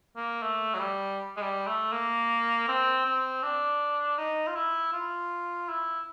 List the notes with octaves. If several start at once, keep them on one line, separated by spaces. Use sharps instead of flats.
A#3
A3
F#3
G3
G#3
G3
A3
A#3
C4
C4
D4
D#4
F4
E4
F4
E4